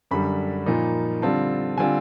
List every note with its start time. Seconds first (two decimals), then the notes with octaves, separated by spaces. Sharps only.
0.11 F#2 D3 G3 B5
0.66 A#2 F3 A#3 D#4
1.22 D3 G3 C4 F4 A5
1.77 D3 G3 C4 F4 G#5